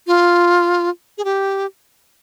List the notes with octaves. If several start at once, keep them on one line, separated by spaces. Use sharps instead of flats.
F4
G#4
G4